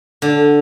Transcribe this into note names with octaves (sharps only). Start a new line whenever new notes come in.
D3